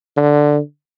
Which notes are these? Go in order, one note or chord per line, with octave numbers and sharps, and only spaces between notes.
D3